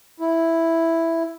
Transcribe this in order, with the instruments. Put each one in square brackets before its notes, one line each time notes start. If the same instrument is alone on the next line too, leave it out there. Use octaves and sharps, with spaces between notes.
[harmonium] E4